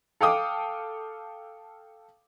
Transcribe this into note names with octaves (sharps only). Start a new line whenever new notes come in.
A4 F5 G5 D6 D#6